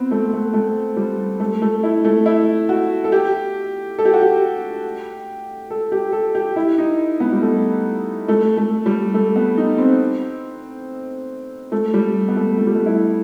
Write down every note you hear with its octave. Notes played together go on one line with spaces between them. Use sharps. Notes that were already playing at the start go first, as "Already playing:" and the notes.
Already playing: B3 C4
A3
A3
A3
G3
A3
A3
E4
A3
E4
F#4
A4
G4
A4
G4
F#4
G4
A4
G4
A4
G4
E4
D#4
B3
G3
A3
A3
A3
G3
A3
B3
D#4
C4
A3
G3
B3
A3
A3
G3
A3
E4